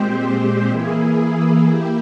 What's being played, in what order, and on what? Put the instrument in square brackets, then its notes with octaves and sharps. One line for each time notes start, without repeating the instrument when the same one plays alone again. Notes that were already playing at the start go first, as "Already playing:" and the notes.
Already playing: [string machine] A#2 G#3 C4 G4 C5
E3 A#3 E4 G#4
A#3 E4 G4